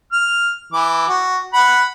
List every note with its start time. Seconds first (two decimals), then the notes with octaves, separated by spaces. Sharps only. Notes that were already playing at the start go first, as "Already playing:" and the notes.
0.12 F6
0.73 E3 D6
1.09 F#4
1.53 F#5 B5